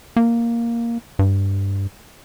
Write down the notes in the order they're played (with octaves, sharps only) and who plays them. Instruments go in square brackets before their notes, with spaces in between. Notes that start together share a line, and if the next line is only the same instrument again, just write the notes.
[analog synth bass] A#3
G2